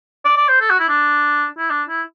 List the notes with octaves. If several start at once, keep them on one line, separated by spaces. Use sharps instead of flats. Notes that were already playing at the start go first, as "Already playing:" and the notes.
D5
D5
C5
A4
F#4
E4
D4
E4
D4
E4